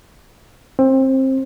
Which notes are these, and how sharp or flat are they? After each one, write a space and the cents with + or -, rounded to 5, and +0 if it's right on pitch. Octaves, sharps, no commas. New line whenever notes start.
C4 +20